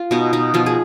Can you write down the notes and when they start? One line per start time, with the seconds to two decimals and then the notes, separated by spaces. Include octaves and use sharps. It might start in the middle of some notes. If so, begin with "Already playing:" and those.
Already playing: F4
0.11 B2 D#4
0.33 B2 D#4
0.54 B2 F3 F4
0.66 G#4